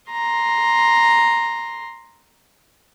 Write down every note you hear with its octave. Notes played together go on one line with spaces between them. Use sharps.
A#5 C6